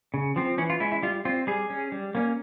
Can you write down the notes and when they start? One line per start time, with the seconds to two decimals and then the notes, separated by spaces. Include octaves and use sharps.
0.14 C#3
0.36 F3 C4
0.58 E3 C#4
0.70 F4
0.80 G#3 C#4 E4
0.92 E4
1.03 G3 F4
1.25 C4 F4
1.47 G3 G#4
1.70 C#4
1.92 G3
2.15 A#3 C#4